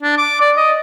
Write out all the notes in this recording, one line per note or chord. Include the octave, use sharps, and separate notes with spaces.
D4
D6
D5
D#5